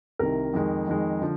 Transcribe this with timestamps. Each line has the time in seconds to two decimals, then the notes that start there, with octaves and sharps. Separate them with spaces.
0.19 C2 C3 D#3 A#4
0.53 F2 D#3 G#3
0.87 F2 D#3 G#3
1.22 D3 F3